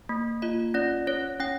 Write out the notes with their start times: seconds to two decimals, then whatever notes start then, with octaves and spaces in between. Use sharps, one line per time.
0.09 A#3
0.42 F4 D#5
0.74 C#4 D5
1.07 C#4 C#5
1.40 C#4 G5